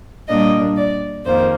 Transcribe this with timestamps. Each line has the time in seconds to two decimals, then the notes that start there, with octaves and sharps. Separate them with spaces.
0.28 A#2 G3 A#3 D4 D#5
0.76 D5
1.25 F2 D#3 A#3 C5